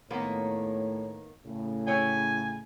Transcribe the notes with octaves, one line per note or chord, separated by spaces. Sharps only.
A2 D#3 A#3 B3 C#5
A2 C#3
E4 C#5 G5 G#5